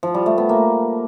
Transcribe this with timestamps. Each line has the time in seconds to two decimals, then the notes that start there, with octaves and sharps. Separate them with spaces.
0.03 F3
0.14 G3
0.26 A3
0.38 B3
0.49 A#3